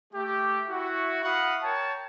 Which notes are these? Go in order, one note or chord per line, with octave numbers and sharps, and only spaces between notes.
A3 G4
E4 F#4
E4 F#4 F5 F#5 B5 D#6
A#4 C#5 G5 A5